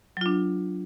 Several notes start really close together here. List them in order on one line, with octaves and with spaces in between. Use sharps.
F#3 F4 D4